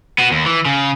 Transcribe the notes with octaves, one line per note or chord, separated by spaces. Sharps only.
B3 F#4
D#2
E3
C#3